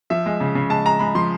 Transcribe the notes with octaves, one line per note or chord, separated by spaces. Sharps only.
F3 E5
G#3
C#3
C#3
G#3 A5
G#3 A#5
G#3 B5
F3 C6